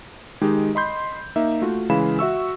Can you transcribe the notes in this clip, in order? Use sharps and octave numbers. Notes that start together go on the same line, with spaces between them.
D#3 G#3 D#4 G4
D#5 B5 C6 G6
A#3 D#4 E5
A3 F4 F#4
C#3 E3 G#3 F5 B5 E7
F#4 E5 C#6 E6